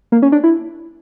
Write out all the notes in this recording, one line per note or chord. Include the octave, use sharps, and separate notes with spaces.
A#3
C#4
D4
E4